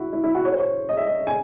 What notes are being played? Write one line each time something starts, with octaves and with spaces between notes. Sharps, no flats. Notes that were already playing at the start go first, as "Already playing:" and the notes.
Already playing: E4 F#4
E4
E4
F#4
C#5
C5
C#5
D#5
E5
D#5
G#5